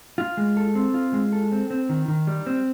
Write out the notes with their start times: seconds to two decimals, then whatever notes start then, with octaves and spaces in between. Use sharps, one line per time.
0.18 F4
0.37 G#3
0.57 A4
0.75 C4
0.94 F4
1.13 G#3
1.33 A4
1.52 C4
1.70 C4
1.89 D#3
2.08 D#3
2.27 G3
2.47 C4